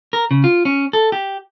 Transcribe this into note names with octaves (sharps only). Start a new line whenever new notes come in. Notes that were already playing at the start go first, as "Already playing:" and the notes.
A#4
C#3
F4
C#4
A4
G4